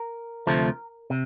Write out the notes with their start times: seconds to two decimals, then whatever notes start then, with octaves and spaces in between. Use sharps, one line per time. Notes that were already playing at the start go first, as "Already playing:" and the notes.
Already playing: A#4
0.47 D2 C3 F3 A3
1.10 C3